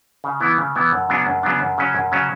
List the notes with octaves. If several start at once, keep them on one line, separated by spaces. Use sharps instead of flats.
C#3
E3 B3 E4
C#3
E3 B3 E4
F#2
C#3 F#3 B3 D4
F#2
C#3 F#3 B3 D4
F#2
C#3 F#3 C#4
F#2
C#3 F#3 C#4